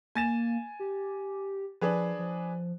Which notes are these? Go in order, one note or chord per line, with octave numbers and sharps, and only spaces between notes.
A#3 G#5 A6 E7
G4
F3 D4 G#4 B4
F3